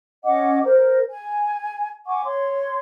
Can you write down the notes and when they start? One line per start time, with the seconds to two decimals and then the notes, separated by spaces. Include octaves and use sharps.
0.24 C#4 D#5 F#5 D6
0.64 A#4 C5
1.10 G#5
2.06 F#5 G#5 C#6 D6
2.24 C#5 C6